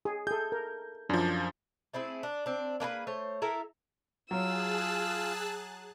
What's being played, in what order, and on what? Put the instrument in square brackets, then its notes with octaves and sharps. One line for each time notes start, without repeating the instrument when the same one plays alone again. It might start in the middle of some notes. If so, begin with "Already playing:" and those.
[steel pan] G#4
[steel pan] G#4 A4 [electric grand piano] G6
[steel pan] A#4
[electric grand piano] F#2 F3 [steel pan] D4
[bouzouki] A3 C4 E4 G#4
D4
C4 D4
A#3 D4 G#4 B4
A3 C5 C#5
E4 A4 A#4 E5
[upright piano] F#3 [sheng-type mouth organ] F4 [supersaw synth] G#4 A5 F#6 [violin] E6